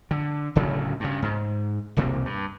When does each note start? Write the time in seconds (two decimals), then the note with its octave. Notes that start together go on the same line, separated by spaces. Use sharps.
0.11 D3
0.55 D1 D2 C#3 F#3
1.00 G2 C#3
1.22 G#2
1.97 E1 C2 C3 A#3
2.26 G2